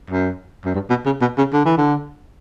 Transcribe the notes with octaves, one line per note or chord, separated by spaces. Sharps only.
F#2
F#2
G2
B2
C#3
B2
C#3
D3
E3
D3